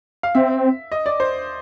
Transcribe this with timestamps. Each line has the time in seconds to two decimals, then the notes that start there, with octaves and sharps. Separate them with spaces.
0.23 F5
0.35 C4 E5
0.92 D#5
1.06 D5
1.20 C5